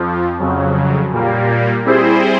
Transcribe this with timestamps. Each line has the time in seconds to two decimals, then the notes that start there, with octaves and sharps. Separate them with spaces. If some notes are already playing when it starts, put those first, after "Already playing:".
Already playing: F2 F3
0.40 F2 C#3 F#3
1.12 A#2 G3 A#3
1.85 G3 C4 E4 G#4 C5